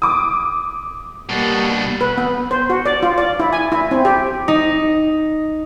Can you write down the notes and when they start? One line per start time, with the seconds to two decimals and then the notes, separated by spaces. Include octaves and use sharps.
0.02 D6 D#6
1.30 B2 G3 A#3 D4
2.01 B4
2.18 B3
2.51 C5
2.70 F#4
2.86 D5
3.03 F4
3.18 D5
3.40 E4
3.53 G#5
3.72 E4
3.91 C4
4.05 G4
4.48 D#4